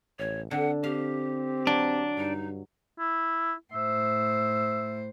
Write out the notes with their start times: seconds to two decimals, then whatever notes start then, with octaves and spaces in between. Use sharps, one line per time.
0.19 A1 C#5
0.51 D3 C4 F#5
0.84 C4 G4 F5
1.67 F#3 D4
2.17 G2 D#4
2.99 E4
3.73 A2 C5 E5